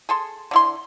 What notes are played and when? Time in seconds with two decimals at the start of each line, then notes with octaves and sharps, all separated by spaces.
0.09 G#4 A4 C6
0.51 D3 E4 C6